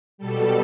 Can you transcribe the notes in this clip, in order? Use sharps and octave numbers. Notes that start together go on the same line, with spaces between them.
B2 G3 A4